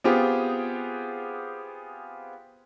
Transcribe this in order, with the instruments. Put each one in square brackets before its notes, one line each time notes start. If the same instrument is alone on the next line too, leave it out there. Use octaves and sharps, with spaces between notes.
[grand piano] B3 C4 F4 G4 G#4